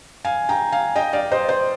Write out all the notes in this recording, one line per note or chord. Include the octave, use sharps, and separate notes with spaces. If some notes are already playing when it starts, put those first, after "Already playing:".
F5 G#5
G5 A#5
F5 G#5
D#5 G5
D5 F5
C5 D#5
C5 D#5